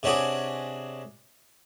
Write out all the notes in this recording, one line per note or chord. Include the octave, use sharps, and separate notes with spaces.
C3 C#4 D4 F#4 G#4